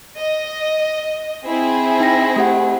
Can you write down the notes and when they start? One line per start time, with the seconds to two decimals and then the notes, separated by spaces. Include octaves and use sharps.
0.18 D#5
1.48 C4 E4 G#4
2.00 D#4 G5 A#6
2.36 A3 G4 F#5